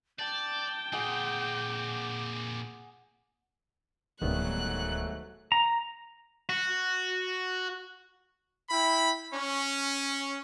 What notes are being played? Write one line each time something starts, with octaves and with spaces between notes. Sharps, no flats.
D5 G5 A5
A#2 C4 G#4 F#5 D6
D1 G#2 D#3 F#3 G3 A3 B3 F#6
A#5
F#4
E4 G5 B5
C#4